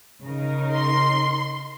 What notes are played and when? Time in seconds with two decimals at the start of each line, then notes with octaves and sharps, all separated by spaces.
0.22 C#3 D#4 A#4
0.73 C6